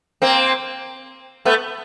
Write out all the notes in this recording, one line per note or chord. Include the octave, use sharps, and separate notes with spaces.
A#3 C4
A3 B3